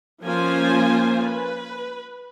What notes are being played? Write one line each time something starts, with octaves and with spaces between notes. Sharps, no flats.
F3 A#3 C#4 F4 C5 G#5
B4